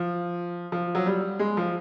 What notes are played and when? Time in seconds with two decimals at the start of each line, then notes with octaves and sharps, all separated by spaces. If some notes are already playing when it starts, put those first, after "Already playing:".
Already playing: F3
0.72 F3
0.95 F#3
1.06 G3
1.39 G#3
1.57 F3